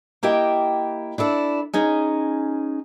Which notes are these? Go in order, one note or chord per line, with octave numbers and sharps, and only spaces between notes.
A#3 E4 G4 D#5 G5
D4 E4 A4 D5
C#4 D#4 G#4